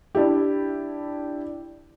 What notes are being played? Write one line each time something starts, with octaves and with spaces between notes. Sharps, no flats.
D4 E4 G4